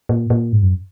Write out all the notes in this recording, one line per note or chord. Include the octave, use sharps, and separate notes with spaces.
A#2
A#2
G#2
F#2